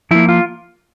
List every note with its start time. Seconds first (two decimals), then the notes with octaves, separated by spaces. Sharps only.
0.11 F3 A#3 E4
0.29 F4